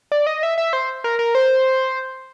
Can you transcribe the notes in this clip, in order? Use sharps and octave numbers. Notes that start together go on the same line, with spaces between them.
D5
D#5
E5
E5
C5
A#4
A#4
C5